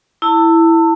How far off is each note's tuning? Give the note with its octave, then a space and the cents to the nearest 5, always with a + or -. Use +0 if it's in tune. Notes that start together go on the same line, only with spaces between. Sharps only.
E4 +0 A5 +35